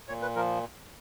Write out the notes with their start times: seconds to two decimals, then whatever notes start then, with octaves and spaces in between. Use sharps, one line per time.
0.08 A#2 C#5
0.22 B4
0.36 F3 A#4